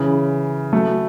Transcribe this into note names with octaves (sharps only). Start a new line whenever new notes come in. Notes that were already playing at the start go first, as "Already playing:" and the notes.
Already playing: C#3 E3
F#3 A3